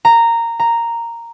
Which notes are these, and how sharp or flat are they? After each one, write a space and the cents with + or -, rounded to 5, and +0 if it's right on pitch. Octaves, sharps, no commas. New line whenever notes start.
A#5 -10
A#5 -5